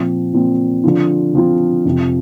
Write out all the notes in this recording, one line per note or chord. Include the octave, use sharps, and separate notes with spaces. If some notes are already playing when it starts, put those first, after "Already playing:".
Already playing: A#2 F3 C4
A#2 F3 C4
D3 F3 C4 F4
D3 F3 C4 F4
F2 C3 F3